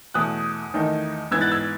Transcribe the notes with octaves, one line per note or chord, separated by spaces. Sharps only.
E2 B2 A3 D#6 F#6
E2 D#3 A3 D#4
G#2 E3 B3 E6 G#6
F#6 A6
E6 G#6